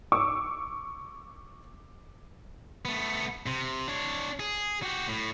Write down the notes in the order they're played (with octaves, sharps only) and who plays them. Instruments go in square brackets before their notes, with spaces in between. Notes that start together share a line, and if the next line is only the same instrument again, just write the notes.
[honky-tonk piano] C#6 D6 E6
[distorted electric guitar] A3 B3
C3
D4 C#5
G#4
F#4 G4
A2